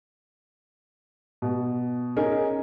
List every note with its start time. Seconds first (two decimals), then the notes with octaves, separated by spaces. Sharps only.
1.42 B2
2.16 C#4 D#4 G#4 A#4